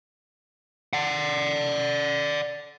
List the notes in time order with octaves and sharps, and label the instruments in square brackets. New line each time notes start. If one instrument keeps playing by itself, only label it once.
[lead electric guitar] D5 F#5